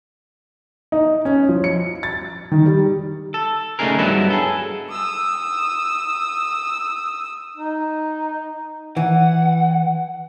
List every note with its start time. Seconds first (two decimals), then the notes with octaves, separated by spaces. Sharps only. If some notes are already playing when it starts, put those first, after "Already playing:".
0.92 D#4
1.25 C#4
1.49 F3
1.64 C#7
2.03 A6
2.52 D#3
2.66 G3
3.34 A4
3.79 C#3 A3 D4 D#4 G#4 A#4
3.99 G2 F#3 B3 D#4 E4
4.30 G#4 A4
4.90 D#6 E6
7.57 D#4
8.97 E3 F#5